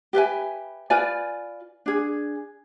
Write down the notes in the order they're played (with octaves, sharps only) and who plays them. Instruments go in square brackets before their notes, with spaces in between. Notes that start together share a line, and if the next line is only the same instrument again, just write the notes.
[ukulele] G4 B4 E5 G#5
F4 B4 D5 G#5
D4 G#4